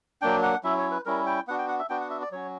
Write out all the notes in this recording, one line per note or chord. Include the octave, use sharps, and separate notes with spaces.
F#3 A#3 D4 G5
F#5
F#3 C#4 E4 E5
C#5
B4
G3 C#4 E4 A#4
G5
B3 D4 F#4 F#5
G5
F#5
E5
B3 D4 F#4 G5
F#5
E5
D5
F#3 C#4 F#4 C#5